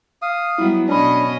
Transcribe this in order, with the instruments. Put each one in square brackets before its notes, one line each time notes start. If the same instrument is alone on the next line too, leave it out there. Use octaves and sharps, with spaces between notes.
[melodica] F5 D#6
[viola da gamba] F#3 G3 B3 [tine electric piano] E4
[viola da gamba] B2 C#5 D#5 [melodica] C#4 [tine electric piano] D4 B5